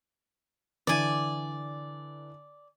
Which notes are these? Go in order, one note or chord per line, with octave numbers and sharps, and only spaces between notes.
D3 E3 D5 G#5